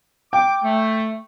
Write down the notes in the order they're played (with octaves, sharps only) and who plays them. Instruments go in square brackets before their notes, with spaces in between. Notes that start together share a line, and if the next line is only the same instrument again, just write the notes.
[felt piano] G5 [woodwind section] D6
[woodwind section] A3